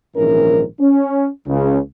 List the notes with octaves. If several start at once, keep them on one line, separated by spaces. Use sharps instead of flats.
A#1 G#2 D#3 E3 C#4 A#4
C#4
C#2 C#3